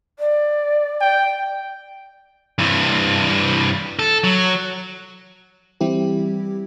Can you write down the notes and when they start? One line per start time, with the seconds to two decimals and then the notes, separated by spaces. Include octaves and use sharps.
0.19 D5
1.01 G5
2.59 G2 E3
3.99 A4
4.24 F#3
5.81 E3 G3 C4 E4 G4